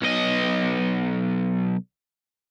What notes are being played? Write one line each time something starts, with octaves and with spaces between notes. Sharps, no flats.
B1 D#5